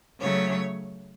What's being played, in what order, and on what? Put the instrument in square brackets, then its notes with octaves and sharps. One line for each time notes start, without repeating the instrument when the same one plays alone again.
[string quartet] C#3 F#3 A3 C#5